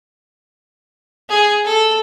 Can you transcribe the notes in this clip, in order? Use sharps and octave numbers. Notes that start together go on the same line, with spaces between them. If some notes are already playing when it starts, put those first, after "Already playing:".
G#4
A4